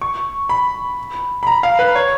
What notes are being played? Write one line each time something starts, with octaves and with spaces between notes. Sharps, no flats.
C#6
B5
B5
A#5
F5
B4
C#5